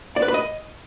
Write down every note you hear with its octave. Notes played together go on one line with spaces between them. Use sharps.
D5
B4
B5
D#5